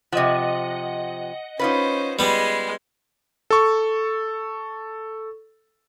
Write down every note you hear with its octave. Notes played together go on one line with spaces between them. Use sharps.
C3 F3 D#5 F#5
C#4 D#4 F4 B4 C5
G3 G#3 B3 C6
A4 C#6